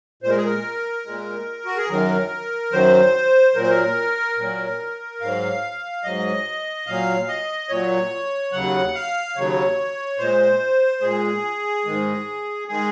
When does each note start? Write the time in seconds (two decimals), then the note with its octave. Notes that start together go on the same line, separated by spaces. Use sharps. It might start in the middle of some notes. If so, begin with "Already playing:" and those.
0.23 A#2 C5
0.26 G#3 A#4
0.37 G#4
0.44 A#4
1.05 A#2 G#3
1.65 F#4
1.77 G#4
1.88 F#2 D#3 F#3 A#4
2.72 F#2 D#3 F#3 C5
3.55 A#2 F#3 A#4
3.63 C5
3.69 A#4
4.37 A#2 F#3
5.21 G#2 F#3 F5
6.03 G#2 F#3 D#5
6.87 A#2 F#3 F5
7.28 D#5
7.69 A#2 F#3 C#5
8.52 D#2 C#3 F#3 F#5
8.95 F5
9.35 D#2 C#3 F#3 C#5
10.18 A#2 G#3 C5
11.01 A#2 G#3 G#4
11.85 G#2 D#3 G#3
12.68 D#3 G#3 G#4